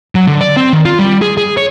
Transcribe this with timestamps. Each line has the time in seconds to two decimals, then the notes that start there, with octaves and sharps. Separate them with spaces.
0.15 F#3
0.27 D3
0.41 D5
0.57 C4
0.73 D#3
0.85 F4
0.99 G3
1.22 G#4
1.37 G#4
1.57 C#5